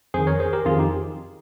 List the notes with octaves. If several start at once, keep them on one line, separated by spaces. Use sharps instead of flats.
F2 D#3 G#4 C5
A#4 C#5
G#4 C5
G4 A#4
F2 D#3 F4 G#4
D#4 G4